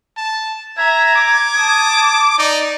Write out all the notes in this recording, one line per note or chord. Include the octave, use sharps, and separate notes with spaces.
A5
E5 A#5 G#6
D6
A5 D#6
D#4 D5